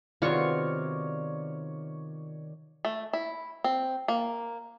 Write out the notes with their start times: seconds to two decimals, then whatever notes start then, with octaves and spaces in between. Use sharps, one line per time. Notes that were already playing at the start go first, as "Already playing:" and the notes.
0.22 C3 D#3 B3 F4 F#4 C#5 D5 C#6
2.85 A3
3.13 E4
3.64 C4
4.08 A#3